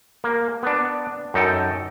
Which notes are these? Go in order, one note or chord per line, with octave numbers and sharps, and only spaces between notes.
A#3
B3 D4
F#2 D#4 A4 G5